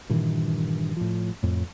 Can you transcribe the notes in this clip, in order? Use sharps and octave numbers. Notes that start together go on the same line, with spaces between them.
G2 A#2 D#3 E3
A2 F3
F2 A2